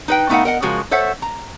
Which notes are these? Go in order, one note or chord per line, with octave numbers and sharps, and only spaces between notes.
D#4 B4 G5
A3 B3 D#4 A#4 F5 F#5
A#4 D#5 F#5
C#3 F3 G#3 F#4 A#4
A4 C5 C#5 E5 F#5
A#5